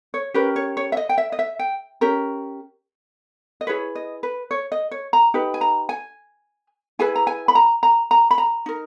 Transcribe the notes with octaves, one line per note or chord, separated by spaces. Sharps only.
C#5
C#4 G4 A#4 B4
C#5
C#5
E5
D#5
G5
E5
D#5
E5
G5
C#4 G4 A#4
D#5
E4 G#4 B4 C#5
D#5
B4
C#5
D#5
C#5
A#5
D#4 G4 B4
G#5
A#5
G#5
E4 G#4 B4 G#5
A#5
G#5
B5
A#5
A#5
A#5
B5
A#5
D#4 A#4